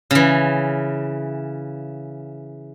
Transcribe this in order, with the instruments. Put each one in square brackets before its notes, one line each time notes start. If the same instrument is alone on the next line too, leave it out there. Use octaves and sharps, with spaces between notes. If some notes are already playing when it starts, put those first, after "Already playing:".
[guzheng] C#3 E3